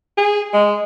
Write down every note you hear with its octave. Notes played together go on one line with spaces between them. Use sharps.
G#4
G#3